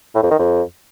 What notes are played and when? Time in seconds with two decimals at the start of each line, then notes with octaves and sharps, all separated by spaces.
0.15 A2
0.23 F2
0.31 D#3
0.39 F2